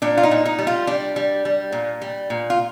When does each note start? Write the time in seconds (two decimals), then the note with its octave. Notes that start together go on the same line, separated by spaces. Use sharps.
0.02 A#2 D4
0.17 F4
0.23 D#4
0.31 A#2
0.45 D#4
0.59 G3
0.67 F4
0.87 G3 D4
1.16 G3
1.45 G3
1.72 A#2
2.02 G3
2.30 A#2
2.50 F4